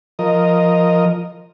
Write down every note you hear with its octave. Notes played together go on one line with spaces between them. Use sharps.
F3 A#4 D#5